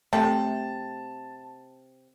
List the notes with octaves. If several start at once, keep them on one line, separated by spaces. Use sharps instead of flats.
C3 A3 A5